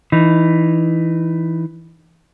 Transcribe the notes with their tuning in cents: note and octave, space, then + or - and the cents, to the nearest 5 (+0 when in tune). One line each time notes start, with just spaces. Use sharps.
E3 +0 D#4 -15